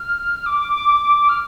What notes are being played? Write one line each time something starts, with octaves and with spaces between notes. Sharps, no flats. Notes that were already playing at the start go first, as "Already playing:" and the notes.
Already playing: F6
D6
F6